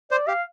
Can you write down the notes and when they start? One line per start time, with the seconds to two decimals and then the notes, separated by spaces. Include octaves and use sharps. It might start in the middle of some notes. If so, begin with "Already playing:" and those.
0.11 C5 D5
0.27 G4 F5